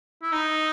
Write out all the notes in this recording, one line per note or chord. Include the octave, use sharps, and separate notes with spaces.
E4
D#4